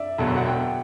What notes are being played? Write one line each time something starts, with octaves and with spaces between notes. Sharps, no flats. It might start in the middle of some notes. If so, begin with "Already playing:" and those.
Already playing: D5 E5
E1 E2 D3 F#3 A5
F#5
G5